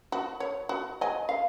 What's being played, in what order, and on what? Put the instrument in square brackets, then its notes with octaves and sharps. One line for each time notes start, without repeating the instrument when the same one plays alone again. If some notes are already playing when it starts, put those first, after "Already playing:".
[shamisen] F#4
C#5
F#4
D#5 G#5
F5